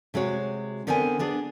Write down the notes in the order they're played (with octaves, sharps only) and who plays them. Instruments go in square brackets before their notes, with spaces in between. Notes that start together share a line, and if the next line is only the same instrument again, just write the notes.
[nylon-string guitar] C3 G#3 F#4 C#5
D3 B3 C4 A#4 B4 G#5
B3 D4 G#4